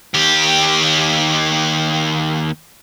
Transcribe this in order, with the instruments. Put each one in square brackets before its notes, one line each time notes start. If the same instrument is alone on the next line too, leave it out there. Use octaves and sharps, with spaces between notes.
[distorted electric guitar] D#2 G4